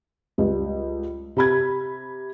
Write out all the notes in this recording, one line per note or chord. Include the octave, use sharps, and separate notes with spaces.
C#2 G3
C3 B5 G#6